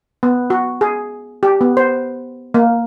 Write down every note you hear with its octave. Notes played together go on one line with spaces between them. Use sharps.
B3
F#4
G#4
G4
B3
C5
A#3